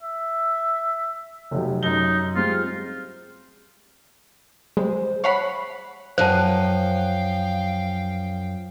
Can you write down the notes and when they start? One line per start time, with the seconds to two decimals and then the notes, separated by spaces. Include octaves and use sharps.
0.03 E5
1.51 F1 F#3 G4
1.83 F#2 D#4 G7
2.36 G3 G#3 C4 F4
4.77 G3 G#3 C5
5.24 C#5 F#5 B5 C7
6.18 F#2 F3 C5 F5 G5 A5